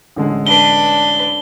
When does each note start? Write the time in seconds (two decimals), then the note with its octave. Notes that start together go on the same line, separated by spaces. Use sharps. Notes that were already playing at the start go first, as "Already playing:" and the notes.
0.16 A1 D3 G#3
0.47 D4 B4 G7